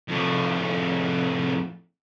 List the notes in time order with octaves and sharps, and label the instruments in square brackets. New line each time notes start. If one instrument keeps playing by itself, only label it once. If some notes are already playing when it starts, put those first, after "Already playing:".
[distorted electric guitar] F2 A2